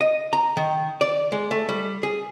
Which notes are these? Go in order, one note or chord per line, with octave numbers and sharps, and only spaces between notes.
D#5
A#5
D#3
D5
G#3
A3
G3
G#4